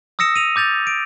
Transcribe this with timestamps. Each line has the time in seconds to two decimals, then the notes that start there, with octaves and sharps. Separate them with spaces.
0.19 D#6 E6 A#6 C#7 E7
0.36 D#7 F7
0.56 D6 G6 A6 F7
0.87 D7